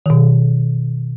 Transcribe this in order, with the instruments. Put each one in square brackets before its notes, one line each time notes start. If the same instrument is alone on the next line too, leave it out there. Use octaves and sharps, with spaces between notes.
[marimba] B2 D#3